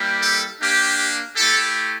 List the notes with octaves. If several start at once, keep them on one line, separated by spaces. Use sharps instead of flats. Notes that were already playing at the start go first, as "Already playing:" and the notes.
Already playing: G3 A#3 E4 G4
A4
A#3 D4 G4
G4
A3 E4 G4 A4